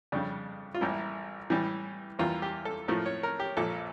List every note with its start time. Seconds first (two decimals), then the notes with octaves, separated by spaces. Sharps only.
0.12 F2 C#3 G3 D4
0.74 F4
0.81 A1 A2 G3 A#3 E4
1.50 A2 E3 G3
2.19 E2 E3 G3 A#3 F4
2.42 G4
2.65 A4
2.88 A2 F3 A3 A#4
3.06 C#5
3.23 A#4
3.40 G4
3.57 A#1 A#2 F3 A4